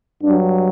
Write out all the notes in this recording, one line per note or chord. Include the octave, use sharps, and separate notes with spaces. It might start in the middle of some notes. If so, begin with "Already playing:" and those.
G2 F#3 D4